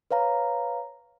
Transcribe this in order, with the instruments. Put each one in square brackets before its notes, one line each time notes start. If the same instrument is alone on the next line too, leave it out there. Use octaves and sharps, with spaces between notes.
[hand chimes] B4 C#5 F5 A#5